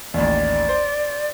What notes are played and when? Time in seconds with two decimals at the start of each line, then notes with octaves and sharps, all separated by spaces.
0.14 A1 D#2 D5
0.69 C5